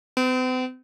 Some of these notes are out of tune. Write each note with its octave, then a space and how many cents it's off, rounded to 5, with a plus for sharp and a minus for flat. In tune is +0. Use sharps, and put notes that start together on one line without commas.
C4 -45